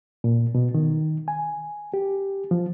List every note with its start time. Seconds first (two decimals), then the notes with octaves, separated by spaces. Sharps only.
0.24 A#2
0.55 B2
0.74 D#3
1.28 G#5
1.94 G4
2.51 F3